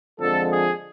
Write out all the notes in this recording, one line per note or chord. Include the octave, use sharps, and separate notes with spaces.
F2 D3 F3 G#3 A4
G#4